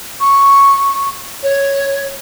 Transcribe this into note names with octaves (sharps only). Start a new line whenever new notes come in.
C#6
C#5